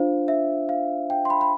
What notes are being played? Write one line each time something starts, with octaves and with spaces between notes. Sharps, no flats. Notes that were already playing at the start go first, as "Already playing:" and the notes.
Already playing: D4 F4 C5 F5
E5
F5
G5
C6
B5
B5